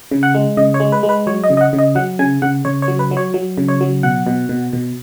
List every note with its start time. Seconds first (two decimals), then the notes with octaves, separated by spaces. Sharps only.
0.11 C#3
0.23 F#5
0.35 G#3
0.57 C#3 D#5
0.74 C#5
0.80 G#3
0.92 B4
1.03 G#3
1.09 B4
1.27 F#3 C#5
1.44 D#5
1.50 C#3
1.57 D#5
1.61 F#5
1.73 C#3
1.78 D#5
1.95 F#3 F#5
2.19 C#3 G#5
2.42 C#3 F#5
2.65 C#3 C#5
2.82 C#5
2.88 F#3
2.99 B4
3.11 F#3
3.17 C#5
3.34 F#3
3.58 C#3
3.68 C#5
3.81 F#3
4.03 B2 F#5
4.27 B2
4.49 B2
4.73 B2